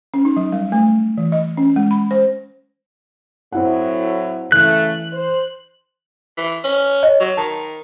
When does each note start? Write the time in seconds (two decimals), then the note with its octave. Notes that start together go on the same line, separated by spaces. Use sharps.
0.14 C#4
0.25 D#4
0.37 F#3
0.52 G3
0.72 A3
1.18 E3
1.32 D#5
1.57 C#4
1.76 G#3
1.91 B5
2.11 C5
3.52 A2 F#3 C4 E4 F#5
4.52 C#3 E3 A3 F#6
5.12 C5
6.37 E3
6.64 C#4
7.03 C#5 D#5
7.20 F#3
7.37 D#3 A5